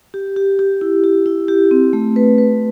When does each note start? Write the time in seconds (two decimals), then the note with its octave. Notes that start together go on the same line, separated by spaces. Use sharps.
0.14 G4
0.36 G4
0.59 G4
0.81 E4
1.04 G4
1.26 E4
1.48 G4
1.71 C4
1.93 A3
2.16 B4
2.38 B4